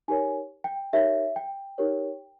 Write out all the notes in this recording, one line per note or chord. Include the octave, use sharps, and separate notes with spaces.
D#4 G4 A#4 C#5 G#5
G5
D#4 G4 A#4 C#5 E5
G5
D#4 G4 A#4 C#5